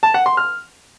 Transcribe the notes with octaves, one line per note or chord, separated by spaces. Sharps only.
A5
F#5
C6
F6